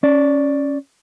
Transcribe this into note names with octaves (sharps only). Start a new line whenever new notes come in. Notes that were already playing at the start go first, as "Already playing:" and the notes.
C#4 D5